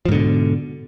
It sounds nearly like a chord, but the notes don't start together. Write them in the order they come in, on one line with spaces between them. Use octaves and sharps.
F3 G#2 D3 B2